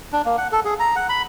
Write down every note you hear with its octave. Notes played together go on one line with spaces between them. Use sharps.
D4
A#3
F#5
A4
G#4
A#5
F#5
B5